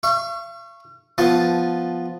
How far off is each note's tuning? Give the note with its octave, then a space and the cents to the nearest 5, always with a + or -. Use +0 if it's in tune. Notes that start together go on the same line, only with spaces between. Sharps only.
F5 -45 C#6 -10
F3 +0 B3 +0 A5 +0